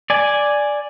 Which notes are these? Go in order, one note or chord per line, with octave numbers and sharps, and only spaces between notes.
D5 G#5